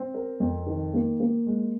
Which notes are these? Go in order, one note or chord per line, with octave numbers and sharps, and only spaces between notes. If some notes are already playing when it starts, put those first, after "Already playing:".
Already playing: C4
A#4
F2
D#3
A#3
A#3
G#3